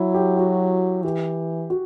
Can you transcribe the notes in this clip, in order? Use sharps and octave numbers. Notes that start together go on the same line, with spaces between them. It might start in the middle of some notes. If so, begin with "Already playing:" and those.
Already playing: F#3 E4
G4
F#4
E3 G4
F#4